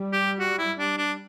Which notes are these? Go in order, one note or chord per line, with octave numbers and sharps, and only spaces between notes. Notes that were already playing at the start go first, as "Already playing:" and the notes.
Already playing: G3
G4
F#4
E4
D4
D4